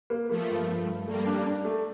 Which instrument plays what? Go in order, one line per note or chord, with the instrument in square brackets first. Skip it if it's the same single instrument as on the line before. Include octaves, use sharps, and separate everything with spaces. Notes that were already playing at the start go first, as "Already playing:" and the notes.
[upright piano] A#3
[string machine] F3 A3 [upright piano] A#3
[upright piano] G2
G2
G2
[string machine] G3 A#3 [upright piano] A3
[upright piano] D4
D4
A3